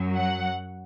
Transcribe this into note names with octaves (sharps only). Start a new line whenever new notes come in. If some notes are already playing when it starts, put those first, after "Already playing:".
Already playing: F#2 F#3
F#5